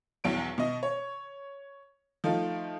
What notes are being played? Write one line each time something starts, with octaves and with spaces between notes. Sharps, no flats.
B1 E2 F#3 D7
B2 D#5
C#5
F3 A3 D#4 F4